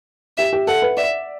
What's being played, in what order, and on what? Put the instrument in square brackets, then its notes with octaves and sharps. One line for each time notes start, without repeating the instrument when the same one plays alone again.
[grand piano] G4 [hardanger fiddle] E5
[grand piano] G4
[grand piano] A4 [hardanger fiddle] F#5
[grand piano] B4
[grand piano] D5 [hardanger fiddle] E5